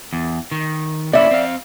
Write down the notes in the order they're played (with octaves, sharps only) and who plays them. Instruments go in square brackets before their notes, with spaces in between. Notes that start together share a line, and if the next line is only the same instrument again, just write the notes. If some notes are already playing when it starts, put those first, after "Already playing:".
[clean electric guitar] E2
D#3
[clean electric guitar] A#3 C#4 E4 [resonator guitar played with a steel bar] D5 E5
[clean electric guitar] C4 F5